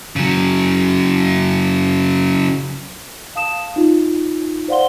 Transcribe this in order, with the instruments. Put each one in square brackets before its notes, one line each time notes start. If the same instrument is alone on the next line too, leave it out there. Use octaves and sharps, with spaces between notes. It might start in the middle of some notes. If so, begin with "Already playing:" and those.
[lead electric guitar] C#3 F#3
[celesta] F5 A5 D#6 E7
D#4 F4
C5 D5 F5 F#5 C6 G7